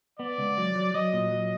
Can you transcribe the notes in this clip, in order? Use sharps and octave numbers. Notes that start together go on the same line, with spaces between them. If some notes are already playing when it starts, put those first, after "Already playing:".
B3 D5
C#2
F#3
F#3
F#3 D#5
A#2
F#3